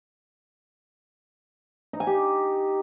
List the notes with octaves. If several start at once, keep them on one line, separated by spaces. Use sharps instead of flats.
D#4
G#5
G4